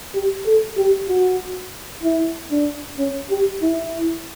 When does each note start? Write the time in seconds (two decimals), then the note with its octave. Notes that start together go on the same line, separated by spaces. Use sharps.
0.14 G4
0.46 A4
0.77 G4
1.09 F#4
2.03 E4
2.51 D4
2.98 C#4
3.30 G4
3.62 E4